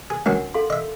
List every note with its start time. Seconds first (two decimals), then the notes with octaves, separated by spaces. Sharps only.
0.10 G#4
0.26 C#2 D#3 F#3 D4 A#4 F#5
0.54 A4 F5 C6
0.70 D#5 E5